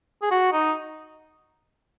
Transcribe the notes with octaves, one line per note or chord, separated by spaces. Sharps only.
G#4
F#4
D#4